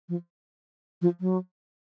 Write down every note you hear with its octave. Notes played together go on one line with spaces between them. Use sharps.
F3
F3
F#3